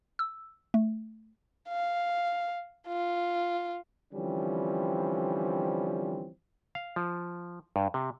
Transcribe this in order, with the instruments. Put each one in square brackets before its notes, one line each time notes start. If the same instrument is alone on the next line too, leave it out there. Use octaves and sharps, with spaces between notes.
[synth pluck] E6
A3
[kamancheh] F5
F4
[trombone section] D3 E3 F3 G3 C4 C#4
[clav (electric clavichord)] F5
F3
G2
C3